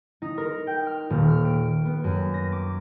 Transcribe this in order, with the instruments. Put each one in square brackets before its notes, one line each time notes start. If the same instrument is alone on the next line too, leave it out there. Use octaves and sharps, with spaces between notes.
[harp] D#4
A#4
G5
F6
D#1
F6
D7
B3
F#2
A#6
D6